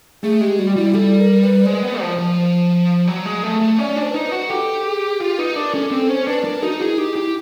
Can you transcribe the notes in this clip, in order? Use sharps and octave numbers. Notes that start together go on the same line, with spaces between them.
A3 G#4
G#3 G4
G3 F#4
G3 E4
G3 A4
A#4
B4
G#3 C5
B3
F3
F3
F#3
G#3
A3
A3
C#4 D5
D4
C5
B4
D#4 C5
B4
F#4
G4 A4
G#4
F4 G4
D#4 B4
D4 A#4
C#4 A4
C4 A4
C#4 C5
D4 B4
D4 A#4
D#4 F#4
E4 G#4
D#4 G4
E4 G4